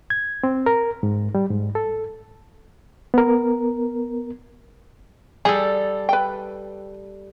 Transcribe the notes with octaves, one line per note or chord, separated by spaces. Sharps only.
G#6
C4
A#4
G#2
G3
G#2
A4
B3 A#4
G3 G#4 A4
B4 G5